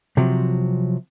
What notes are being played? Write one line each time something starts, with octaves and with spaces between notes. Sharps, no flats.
C3 F3 F#3